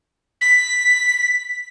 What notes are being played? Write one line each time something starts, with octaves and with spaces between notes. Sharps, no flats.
B6